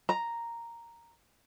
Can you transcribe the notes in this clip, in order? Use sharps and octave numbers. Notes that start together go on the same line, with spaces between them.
A#5